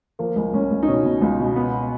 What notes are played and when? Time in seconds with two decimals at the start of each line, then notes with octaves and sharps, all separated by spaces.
0.19 F3 A#3 F4
0.36 C#2
0.53 C#2 C#4
0.71 C#2
0.83 D#4
0.88 B2 C#4
1.05 B2
1.22 C#2
1.39 B2
1.56 B3